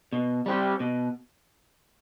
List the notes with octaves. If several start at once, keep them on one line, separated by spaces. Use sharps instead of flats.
B2
G3 C4 G4
B2